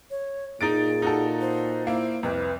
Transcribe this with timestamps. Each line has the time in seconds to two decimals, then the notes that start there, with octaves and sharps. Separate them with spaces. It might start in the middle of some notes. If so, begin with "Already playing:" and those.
0.11 C#5
0.61 A#2 D#4 G#4 A6 D7
1.02 D#4 F#4 A4
1.41 C5
1.87 A#3 E4 C5
2.23 C2 F2 B4